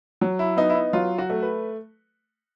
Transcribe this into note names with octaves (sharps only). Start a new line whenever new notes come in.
F#3
E4
B3 D#4
E4
D#4
F#3 F4
F#4
A3
B4